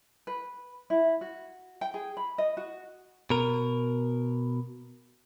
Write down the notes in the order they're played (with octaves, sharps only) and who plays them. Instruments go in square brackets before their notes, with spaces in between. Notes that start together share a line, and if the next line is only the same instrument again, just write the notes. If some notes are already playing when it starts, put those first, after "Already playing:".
[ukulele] B4
E4
F#4
G5
G#4
B5
D#5
F#4
[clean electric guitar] B2 A#4